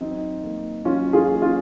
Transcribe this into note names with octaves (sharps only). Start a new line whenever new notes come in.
F#3 C4 D#4
A#3
F#3 C#4 F4
F4 G#4
A#3
C#4 F4